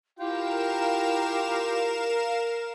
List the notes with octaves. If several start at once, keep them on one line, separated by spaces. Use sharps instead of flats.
E4 F4 G4 A#4 F5 G5 E7